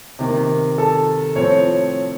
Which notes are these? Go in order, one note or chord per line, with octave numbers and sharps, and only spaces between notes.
C3 D#3 A#3
A4
A2 F3 C4 C#5